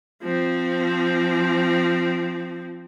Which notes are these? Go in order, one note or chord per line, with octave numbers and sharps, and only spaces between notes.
F3 C4